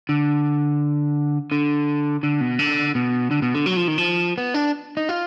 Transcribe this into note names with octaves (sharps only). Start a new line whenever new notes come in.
D3
D3
D3
B2
D3
B2
D3
B2
D3
F#3
F3
D#3
F3
B3
D4
D#4
F4